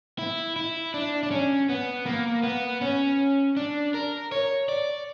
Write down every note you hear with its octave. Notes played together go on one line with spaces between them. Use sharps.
E4
E4
D4
D4
C#4
B3
A#3
B3
C#4
D4
A#4
C#5
D5